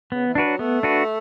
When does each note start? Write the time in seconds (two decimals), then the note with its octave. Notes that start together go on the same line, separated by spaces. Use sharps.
0.12 C#3 B3
0.28 E3
0.35 D4 F#4 B4
0.45 F#3
0.59 A3 B3
0.83 D4 F#4 B4